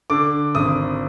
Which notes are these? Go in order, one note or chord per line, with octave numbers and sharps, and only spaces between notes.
D3 D6
G#1 D#6